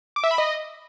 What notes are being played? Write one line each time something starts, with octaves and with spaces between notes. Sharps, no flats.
D6
E5
B5
D#5